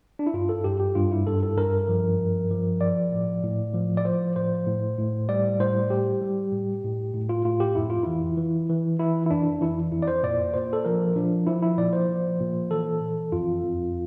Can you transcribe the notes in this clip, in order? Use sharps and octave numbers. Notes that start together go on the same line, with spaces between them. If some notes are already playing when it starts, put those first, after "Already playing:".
D4
E4
G2 F4
A4
G2 G4
G4
G2 F4
E4
G2 A4
A4
G2 A#4
F3
G2
F3
F3 D5
A2
A2
F3
D5
F3 C5
A2 C5
A2
A2
G3 D5
A2 C5
G3 G4
G3
A2
A2
A2
F4
A2 F4
G4
F2 E4
F4
E3 E4
E3
E3
E3 E4
E4
F2 D4
E3 E4
F2 E4
D5
C5
A#2 D5
A#2 C5
A4
F3 A#4
F3 D4
F3 E4
E4
A#2 D5
C5
F3
A#2
E3 A4
E3
F2 F4
F2